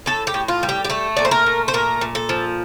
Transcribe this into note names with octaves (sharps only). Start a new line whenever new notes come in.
A2 A4
G4
A2
F4
G3
G4
G4
A3 A4
A#2 D5
C5
A#4
A3
C5
A#2 A#4
A#2
A4
F3